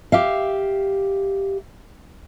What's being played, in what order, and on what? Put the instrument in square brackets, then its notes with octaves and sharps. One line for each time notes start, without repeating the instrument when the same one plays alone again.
[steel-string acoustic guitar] G4 E5 F5